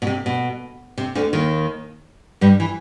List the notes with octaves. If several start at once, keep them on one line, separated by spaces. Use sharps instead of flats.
B2
C3
B2
C3
D2 D3
D#2 D#3
G2 G3
E3